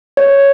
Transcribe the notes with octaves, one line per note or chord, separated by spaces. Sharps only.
C#5